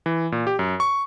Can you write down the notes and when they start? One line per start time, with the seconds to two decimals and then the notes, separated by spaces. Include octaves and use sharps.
0.06 E3
0.32 A#2
0.47 G4
0.59 F#2
0.80 C#6